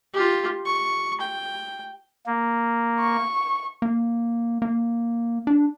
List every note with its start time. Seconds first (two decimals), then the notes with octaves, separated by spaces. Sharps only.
0.14 F4 G4
0.66 C#6
1.20 G5
2.27 A#3
2.99 C#6
3.82 A#3
4.62 A#3
5.47 D4